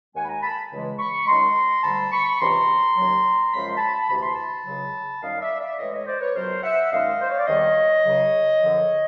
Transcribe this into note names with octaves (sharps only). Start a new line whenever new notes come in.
D#2 D#3 G#3 F#5 G#5
B5
G#5 A#5
A5 B5
C#2 C#3 E3 G#3
B5 C#6
F#2 D#3 G#3 A#5 C6
D2 D3 G3 A5 B5
B5 C#6
C#2 C3 E3 A#5 C6
D#2 C#3 F#3
F#2 C#3 F3 G#3 B5
C6
A5 B5
D2 C3 E3 B5
C6
A5 B5
C#2 C#3 F#3
F#2 D#3 G3 D#5 F5
D5 E5
D5 E5
A2 E3 G#3 C#5 D#5
C#5 D#5
C5 D5
B4 C#5
C#2 B2 F#3 A#4 C5
E5 F#5
F#2 D#3 G#3 D#5 F5
C5
C#5
D5
E2 C3 D#3 G3 C#5 D#5
C#2 C#3 F#3
F#2 D3 F3